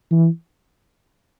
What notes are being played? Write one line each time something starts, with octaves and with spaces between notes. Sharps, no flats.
E3